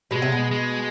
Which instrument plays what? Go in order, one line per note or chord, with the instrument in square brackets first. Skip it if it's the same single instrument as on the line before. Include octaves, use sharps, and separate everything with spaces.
[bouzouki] B2 [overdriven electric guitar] G#3
[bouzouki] C3
B2
[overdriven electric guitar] G#3